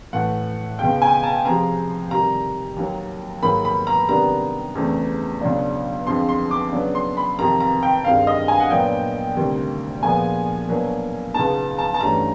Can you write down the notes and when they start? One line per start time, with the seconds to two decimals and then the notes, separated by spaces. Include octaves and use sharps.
0.13 A2 E3 A3 F#5
0.79 C#2 B2 G#3 G5
1.02 G#5
1.23 A5
1.45 C3 F3 G#3 C4 A#5
2.11 C3 D#3 G3 A#5
2.76 D#2 D#3 F#3
3.42 G#2 D#3 F#3 A#3 B5
3.65 B5
3.87 A#5
4.08 C3 D#3 G3 B3 D4 A#5
4.75 E2 C#3 E3 A3 C4
5.41 C#2 B2 F#3 B3 D4
6.07 F2 D3 F3 G#3 C4 C6
6.29 C6
6.51 D6
6.72 C#3 F#3 B3 D4
6.95 C6
7.17 B5
7.39 F2 C3 D#3 A#5
7.60 A#5
7.83 G5
8.04 G2 D#3 G#3 C4 F5
8.27 D#5
8.48 G#5
8.60 F#5
8.71 A#2 F#3 B3 D4 G5
9.37 D2 C3 D#3 G3
10.02 A#2 F3 G#3 B3 G#5
10.69 B2 F#3 A#3 D4
11.34 C#2 B2 G#3 B3 D#4 A5
11.78 A5
11.94 A5
12.01 G2 E3 A3 C#4 A#5